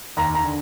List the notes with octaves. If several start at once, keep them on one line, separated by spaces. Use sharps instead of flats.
D#2 A#5
A#5
D3